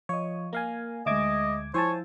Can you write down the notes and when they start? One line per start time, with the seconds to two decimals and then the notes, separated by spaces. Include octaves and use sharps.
0.09 F3 C#5 D#5
0.53 A#3 A#4 F5 G#5
1.06 D2 G#3 D#5 E5 D6 G#6
1.74 F3 E4 C5 C#5 G#5 A5